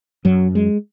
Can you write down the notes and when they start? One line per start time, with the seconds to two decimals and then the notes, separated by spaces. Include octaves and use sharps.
0.25 F#2 F#3
0.55 G#3